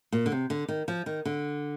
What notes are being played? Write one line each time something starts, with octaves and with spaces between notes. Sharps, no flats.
A#2
D3
C3
D3
D#3
F3
D#3
D3